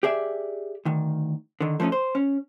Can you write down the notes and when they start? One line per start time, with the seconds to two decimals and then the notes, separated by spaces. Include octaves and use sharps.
0.03 G4 G#4 D5 E5
0.85 D2 D#3
1.61 D3 D#3
1.80 F3 A3 B3 C#4 D#4
1.92 C5
2.15 C#4